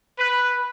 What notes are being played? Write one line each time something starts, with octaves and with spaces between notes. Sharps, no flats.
B4